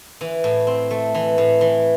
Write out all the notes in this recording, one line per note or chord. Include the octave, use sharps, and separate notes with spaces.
E3
A2
C4
A3
E3
A2
E3